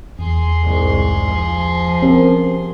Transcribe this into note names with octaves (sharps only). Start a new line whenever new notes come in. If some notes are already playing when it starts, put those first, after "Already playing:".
E2 G#4 C6
C2 G#2
F3
C4 C#4 G4 A#4